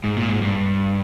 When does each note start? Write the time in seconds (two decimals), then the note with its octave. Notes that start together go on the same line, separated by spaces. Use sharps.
0.04 G#2
0.17 A#2
0.29 G#2
0.41 G2